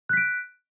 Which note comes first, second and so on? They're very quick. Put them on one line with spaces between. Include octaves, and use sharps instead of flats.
F#6 B6 D7